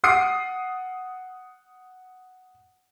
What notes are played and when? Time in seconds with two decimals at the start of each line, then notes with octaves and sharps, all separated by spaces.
0.04 F#5 D#6 C7 D7